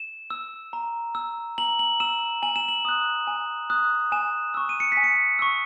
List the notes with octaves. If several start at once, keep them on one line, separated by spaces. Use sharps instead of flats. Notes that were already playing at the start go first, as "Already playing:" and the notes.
Already playing: E7
E6
A#5
E6
A#5 F#7
F#7
E6 E7
G#5 F#7
E7
F#7
D#6 F#6
G#5
D#6 F#6
G#5 E7
C#6 E6
D#7
C#7
B6
G#5
C#7
C#6 E6